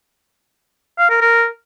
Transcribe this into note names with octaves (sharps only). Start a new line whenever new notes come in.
F5
A#4
A#4